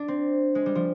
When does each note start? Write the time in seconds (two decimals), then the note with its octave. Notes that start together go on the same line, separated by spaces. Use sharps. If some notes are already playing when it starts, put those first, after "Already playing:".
Already playing: D4
0.08 C4
0.55 G#3
0.66 G3
0.75 F3